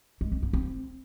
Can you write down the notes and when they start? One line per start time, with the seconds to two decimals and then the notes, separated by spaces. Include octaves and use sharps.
0.21 G#3
0.32 C4
0.43 B3
0.53 C4